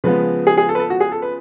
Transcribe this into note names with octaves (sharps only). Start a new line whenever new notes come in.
C#3 F3 G#3 B3 B4
G#4
G#4
A4
B4
A4
F#4
G#4
A4
B4